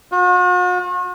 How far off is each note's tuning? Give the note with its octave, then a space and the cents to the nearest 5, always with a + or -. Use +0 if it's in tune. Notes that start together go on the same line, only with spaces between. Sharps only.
F#4 -45